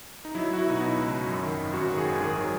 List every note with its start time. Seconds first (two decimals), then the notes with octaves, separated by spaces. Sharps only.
0.25 D#4
0.35 F#3 E4
0.51 F#3 F#4
0.58 E4
0.67 B2 D#4
0.81 B2 E4
0.97 C#2
1.13 F#3
1.27 F#2
1.43 D#3
1.59 G#1
1.73 F#2 F#4
1.90 D#3
1.97 G#4
2.05 G#1
2.20 D#3 G#4
2.35 F#3